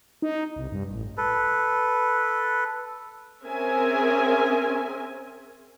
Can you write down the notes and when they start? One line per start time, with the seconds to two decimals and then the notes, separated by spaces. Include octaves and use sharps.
0.22 D#4
0.56 C2
0.72 G2
0.90 A1
1.17 A4 B4
3.44 C4 C#4 G#4 A#4 E5 G#5